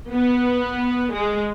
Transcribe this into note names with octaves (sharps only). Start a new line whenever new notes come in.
B3
G#3